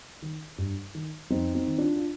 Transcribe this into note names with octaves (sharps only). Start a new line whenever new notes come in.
D#3
G2
D#3
F2 C4 D#4
C4 D#4
D#3
D4 F4
F4